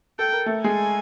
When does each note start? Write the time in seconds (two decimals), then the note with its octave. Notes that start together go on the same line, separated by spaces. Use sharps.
0.19 A4 G5
0.32 A#4
0.46 A3 A4
0.64 G#3 G#4 G#5